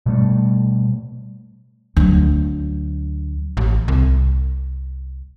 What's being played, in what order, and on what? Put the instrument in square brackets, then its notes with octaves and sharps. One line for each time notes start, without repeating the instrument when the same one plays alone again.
[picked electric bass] B2 G3 A3
[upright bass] D2 F#3
[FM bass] A1
C2